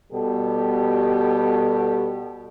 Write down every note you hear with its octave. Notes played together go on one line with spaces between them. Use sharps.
B2 G3 G4 A4